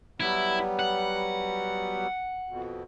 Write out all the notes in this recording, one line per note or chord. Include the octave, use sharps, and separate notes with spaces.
F#3 G3 B3 E4
F#5
F2 B2